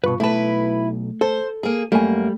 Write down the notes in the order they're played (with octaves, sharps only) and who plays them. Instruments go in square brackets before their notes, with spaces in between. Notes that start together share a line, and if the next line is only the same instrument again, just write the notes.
[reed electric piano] G2 F4 C#6 [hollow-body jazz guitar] B2 B4
[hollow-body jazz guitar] B1 A5 [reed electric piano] A3 [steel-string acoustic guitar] E4 B4
[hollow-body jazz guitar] A4 [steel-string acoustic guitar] C5
[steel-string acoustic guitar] A#3 G#4
[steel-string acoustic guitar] F#2 A#3 [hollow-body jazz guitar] G3 G#5 [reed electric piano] A3